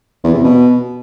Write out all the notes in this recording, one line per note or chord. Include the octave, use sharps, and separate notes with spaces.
E2
C3
B2